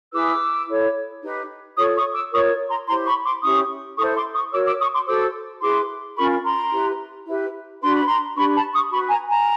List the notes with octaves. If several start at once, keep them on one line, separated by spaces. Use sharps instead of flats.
E4 G#4 B4 D6 E6
E4 A4 C#5
D#4 G4 B4
F4 A4 C#5 C#6 D#6
C#6 D#6
D6 E6
F4 A#4 C#5 C#6 D#6
A#5 C6
E4 G4 C5 A#5 C6
B5 C#6
C6 D6
C#4 E4 G4 C#6 D#6
E4 A4 C5 C#6 D#6
C6 D6
C#6 D#6
F#4 A#4 C#5 D6 E6
D6 E6
C#6 D#6
C6 D6
F#4 A4 C5 D6 E6
E4 G#4 B4 C6 D6
C#4 F4 A#4 B5 C#6
A#5 C6
E4 G4 B4
E4 G4 B4
D4 F#4 B4 C6
B5
A#5 C6
D4 G4 B4 B5 C#6
A5 B5
C#6 D#6
F#4 B4 B5 C#6
G#5 A#5
G#5 A#5